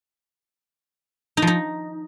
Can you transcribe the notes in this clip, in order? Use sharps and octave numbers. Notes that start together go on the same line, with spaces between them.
D#4
F3
D#4